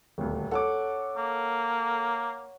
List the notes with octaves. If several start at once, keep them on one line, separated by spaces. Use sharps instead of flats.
D#1 D2
A4 C#5 F#5 D6
A#3